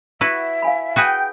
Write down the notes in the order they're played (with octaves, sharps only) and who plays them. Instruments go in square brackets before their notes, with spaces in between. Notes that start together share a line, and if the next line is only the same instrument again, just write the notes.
[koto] E4 F#4 B4 [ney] E5 [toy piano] C#6
[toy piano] F5 G#5 B5
[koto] F#4 G#4 B4 [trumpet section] G5